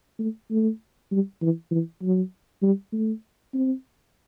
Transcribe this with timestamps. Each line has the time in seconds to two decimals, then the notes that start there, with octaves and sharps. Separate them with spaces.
0.19 A3
0.50 A3
1.11 G3
1.42 E3
1.71 E3
2.02 F#3
2.62 G3
2.92 A3
3.54 C4